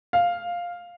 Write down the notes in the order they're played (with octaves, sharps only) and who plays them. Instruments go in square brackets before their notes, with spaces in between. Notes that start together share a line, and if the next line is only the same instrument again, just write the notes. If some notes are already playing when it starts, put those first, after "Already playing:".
[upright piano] F5